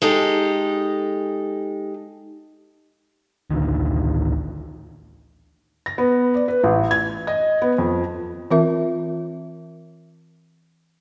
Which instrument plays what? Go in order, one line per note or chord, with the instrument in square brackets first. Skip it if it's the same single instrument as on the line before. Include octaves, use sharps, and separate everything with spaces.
[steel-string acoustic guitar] G#3 D#4 G4 A4
[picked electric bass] A1 D2 D3 D#3
[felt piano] A#6
B3
D5
B4
A1
G#6
D#5
B3
F2
[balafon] E3 C4 F4 A#4 E5